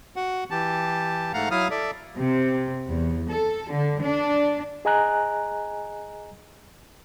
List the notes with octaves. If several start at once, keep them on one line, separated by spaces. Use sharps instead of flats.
F#4 F#5
E3 G4 A5
G#2 A3 F5 F#5 A#5
F#3 E4 F5 D#6 F6
A4 D5 E5
C3
E2
A4
D3
D4
G#4 D#5 G#5 A#5 F#6